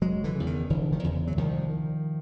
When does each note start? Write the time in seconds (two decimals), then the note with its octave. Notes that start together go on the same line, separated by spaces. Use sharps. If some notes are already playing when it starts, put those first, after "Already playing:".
0.01 F1 F#3 G#3
0.24 D3 E3
0.35 E2 C#3
0.47 D#3
0.70 F1 D3 E3
0.92 D#3 F3
1.04 E2 C#3
1.27 F#3
1.37 C2 D#3 F3